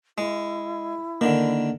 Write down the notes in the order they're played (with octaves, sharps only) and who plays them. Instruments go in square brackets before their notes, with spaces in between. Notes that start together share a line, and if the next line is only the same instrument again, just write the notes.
[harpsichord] G#3 [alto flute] E4
[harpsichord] D3 D#3 [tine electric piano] A#3 D4